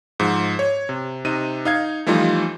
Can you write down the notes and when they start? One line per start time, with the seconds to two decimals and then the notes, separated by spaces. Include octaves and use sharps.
0.20 G#2 F3
0.59 C#5
0.89 C3
1.25 C3 D#4 D#7
1.65 D#4 F5 G#6
2.06 E3 F3 G3 A3 D#4 F4